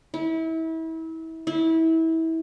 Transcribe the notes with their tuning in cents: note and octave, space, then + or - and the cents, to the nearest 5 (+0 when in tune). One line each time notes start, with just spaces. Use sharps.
E4 -30
E4 -25